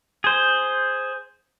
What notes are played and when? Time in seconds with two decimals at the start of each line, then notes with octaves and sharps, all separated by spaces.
0.24 G#4 C5